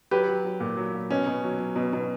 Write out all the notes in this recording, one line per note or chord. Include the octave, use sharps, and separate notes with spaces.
F#3 G4 B4
F#3
F#3
A#2
F#3
A#2
B2 C#4
B2
F#3
F#3
B2
B2